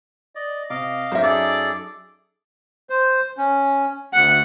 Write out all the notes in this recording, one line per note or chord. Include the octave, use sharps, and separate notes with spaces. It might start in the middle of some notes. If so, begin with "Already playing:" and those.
D5 D#5
C3 D#5 F5 D6
F#2 D#4 C5 E5
G#4 A4 D5 D6
C5
C#4
D2 F#5